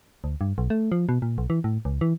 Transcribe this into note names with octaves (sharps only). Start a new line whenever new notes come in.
D2
G2
B1
A3
F3
B2
A#2
B1
E3
A2
C#2
E3